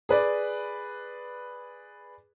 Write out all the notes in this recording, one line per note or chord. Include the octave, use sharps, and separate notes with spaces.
G#4 B4 D5